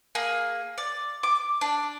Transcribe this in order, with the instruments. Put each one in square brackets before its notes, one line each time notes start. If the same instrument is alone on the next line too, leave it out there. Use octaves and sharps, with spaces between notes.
[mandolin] A#3 G#4
D5
D6
D4